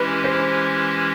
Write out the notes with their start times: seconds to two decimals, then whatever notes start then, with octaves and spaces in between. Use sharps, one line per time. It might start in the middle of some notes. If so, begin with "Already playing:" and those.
Already playing: E3 G#3 C#4 E4 G4 B4
0.24 C5